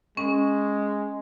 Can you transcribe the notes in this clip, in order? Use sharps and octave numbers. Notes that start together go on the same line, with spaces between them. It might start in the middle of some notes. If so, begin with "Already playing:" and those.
G#3 C#4